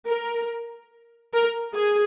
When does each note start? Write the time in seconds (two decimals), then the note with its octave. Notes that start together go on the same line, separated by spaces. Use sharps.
0.08 A#4
1.33 A#4
1.75 G#4